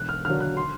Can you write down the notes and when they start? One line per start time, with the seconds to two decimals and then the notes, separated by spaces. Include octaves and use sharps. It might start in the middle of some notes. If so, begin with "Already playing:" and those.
Already playing: E1 F#6
0.09 F6
0.25 D#2 D3 F#3 F6
0.40 F#6
0.57 C6